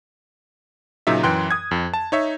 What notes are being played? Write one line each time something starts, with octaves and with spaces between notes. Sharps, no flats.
A#2 C#3 F#3 D#4 E5
F#2 E3 G5 C6 F#6
D#6 G#6
F2
A5
D#4 C#5 E5